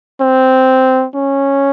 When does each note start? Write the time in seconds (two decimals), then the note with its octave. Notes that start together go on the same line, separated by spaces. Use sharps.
0.21 C4
1.16 C#4